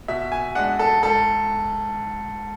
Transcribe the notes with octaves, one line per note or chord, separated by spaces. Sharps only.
B2 E5
G#5
G#3 D4 F#5
A4
G#2 A4